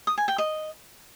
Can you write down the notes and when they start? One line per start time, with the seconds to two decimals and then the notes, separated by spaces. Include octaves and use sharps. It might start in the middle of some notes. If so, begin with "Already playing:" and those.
0.07 D#6
0.18 G#5
0.28 G5
0.38 D#5